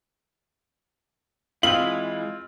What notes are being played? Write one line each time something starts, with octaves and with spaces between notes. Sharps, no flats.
E3 G#3 C4 E4 F4 F5 F#7